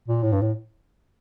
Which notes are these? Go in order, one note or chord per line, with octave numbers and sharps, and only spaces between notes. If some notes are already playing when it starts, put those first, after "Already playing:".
A#2
A2
G2
A2